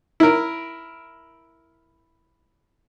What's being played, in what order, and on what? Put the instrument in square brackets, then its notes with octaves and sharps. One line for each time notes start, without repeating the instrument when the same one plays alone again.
[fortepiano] E4 A#4